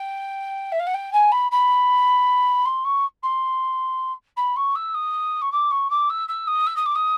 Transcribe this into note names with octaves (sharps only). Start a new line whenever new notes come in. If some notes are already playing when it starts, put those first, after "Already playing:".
Already playing: G5
E5
F5
F#5
G5
G#5
B5
B5
C6
C#6
C6
B5
C#6
E6
D#6
C#6
D6
C#6
D6
E6
E6
D#6
E6
D#6
D6
D#6